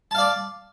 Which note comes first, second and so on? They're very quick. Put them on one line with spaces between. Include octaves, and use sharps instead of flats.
A5 F5 D5